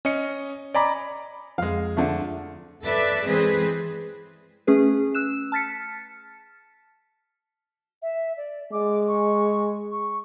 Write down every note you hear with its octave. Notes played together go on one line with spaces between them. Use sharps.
C#4 D#5 C#7
D5 D#5 G#5 A#5 B5 D6
F2 G#3 F5
D3 F3 A3
A4 B4 D5 E5
E3 G#3 C4 G#4 B4
A3 C#4 G#4 B4
E6 F#6 E7
A5 F6 A6 B6 C#7
E5
D5
G#3 D6
C#6
C#6